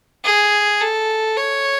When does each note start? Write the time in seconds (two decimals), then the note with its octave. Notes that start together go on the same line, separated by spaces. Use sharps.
0.24 G#4
0.81 A4
1.37 C#5